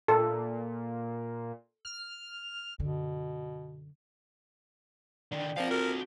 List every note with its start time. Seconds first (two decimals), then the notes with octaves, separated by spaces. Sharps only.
0.08 A#2 A4
1.85 F6
2.80 F#2 B2 D3
5.32 D3 D#3 D5 G5
5.57 F3 C4 F4 A#4 F5
5.71 F#4 A4 A#4